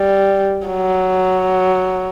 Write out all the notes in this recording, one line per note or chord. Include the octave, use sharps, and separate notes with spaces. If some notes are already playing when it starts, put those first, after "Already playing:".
Already playing: G3
F#3